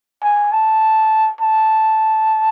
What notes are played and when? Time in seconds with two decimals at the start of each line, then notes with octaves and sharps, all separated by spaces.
0.23 G#5
0.52 A5
1.40 A5